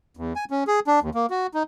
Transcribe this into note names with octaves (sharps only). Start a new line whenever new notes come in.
E2
G#5
C#4
G#4
D4
D#2
A#3
F#4
D#4